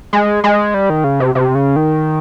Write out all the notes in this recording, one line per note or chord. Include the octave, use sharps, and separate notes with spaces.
G#3
G#3
G3
D#3
C#3
C3
C3
C#3
D#3